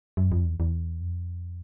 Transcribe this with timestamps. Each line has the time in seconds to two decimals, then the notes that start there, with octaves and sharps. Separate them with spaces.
0.17 F#2
0.32 F2
0.45 E2
0.60 E2
1.01 F2